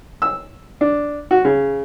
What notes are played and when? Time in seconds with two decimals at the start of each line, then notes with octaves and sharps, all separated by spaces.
0.22 E6
0.81 D4
1.31 F#4
1.45 C#3